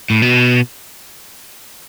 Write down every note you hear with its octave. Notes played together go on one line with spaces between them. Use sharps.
A2
B2